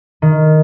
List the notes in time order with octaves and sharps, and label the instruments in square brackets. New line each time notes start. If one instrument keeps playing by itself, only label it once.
[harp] D#3